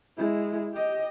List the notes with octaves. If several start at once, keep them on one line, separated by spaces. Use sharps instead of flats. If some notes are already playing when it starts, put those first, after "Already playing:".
G#3 E4
G4 D#5